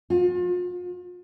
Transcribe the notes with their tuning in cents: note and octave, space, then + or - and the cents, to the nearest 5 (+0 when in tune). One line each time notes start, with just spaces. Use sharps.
F4 +40